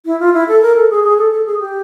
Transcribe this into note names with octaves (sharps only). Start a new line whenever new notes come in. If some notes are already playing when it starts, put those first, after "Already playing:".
E4
F4
E4
A4
A#4
A4
G#4
G#4
A4
A4
G#4
G4